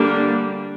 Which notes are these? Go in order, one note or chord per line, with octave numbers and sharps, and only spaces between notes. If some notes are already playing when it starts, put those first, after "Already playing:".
Already playing: D3 G3 A#3 D4